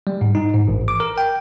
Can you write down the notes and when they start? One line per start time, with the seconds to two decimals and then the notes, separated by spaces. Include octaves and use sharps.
0.07 G3
0.21 G#2
0.35 D#4
0.54 G#2
0.68 A1
0.88 D6
1.00 A#4
1.18 G5